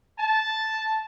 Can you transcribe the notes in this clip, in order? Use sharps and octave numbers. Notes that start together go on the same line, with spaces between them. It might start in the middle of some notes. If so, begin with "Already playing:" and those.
A5